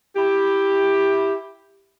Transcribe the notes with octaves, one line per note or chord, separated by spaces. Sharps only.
E4 G4